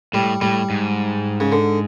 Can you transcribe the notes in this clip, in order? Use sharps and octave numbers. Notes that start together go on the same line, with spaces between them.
A2 G3
A2 G3
G#2
C#3
D3